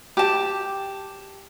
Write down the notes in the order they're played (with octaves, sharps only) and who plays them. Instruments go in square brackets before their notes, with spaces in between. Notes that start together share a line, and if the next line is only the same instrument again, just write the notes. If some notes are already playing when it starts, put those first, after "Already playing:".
[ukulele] G4 A5